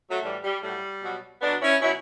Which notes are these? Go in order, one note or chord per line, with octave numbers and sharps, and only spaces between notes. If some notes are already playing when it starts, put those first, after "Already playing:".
F#3 A3
A2 E3 G3
G3
A2 F#3 G3
B2 F#3
B2 F#3 B3 D4
C#4 E4
B2 F#3 C#4 E4